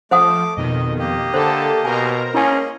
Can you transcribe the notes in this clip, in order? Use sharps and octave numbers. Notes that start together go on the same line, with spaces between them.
F3 A3 C5 F#5 D6 D#6
F2 B2 D#3 D#5
A#3 G4 D#5
D3 A4 C5 A5
B2 A#4 C5 G#5 A#5
A#3 C#4 E4 G#4 D#5 G#5